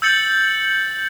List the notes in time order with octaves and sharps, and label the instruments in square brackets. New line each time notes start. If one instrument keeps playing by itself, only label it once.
[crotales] E6 G6 A6 C#7 F#7